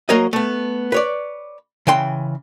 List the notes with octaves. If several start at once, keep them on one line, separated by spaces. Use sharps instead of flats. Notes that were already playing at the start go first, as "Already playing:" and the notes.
F#3 A#3 A#4 C#5 D#5
A3 B3
B4 C#5 D5
C#3 E3 G5 C6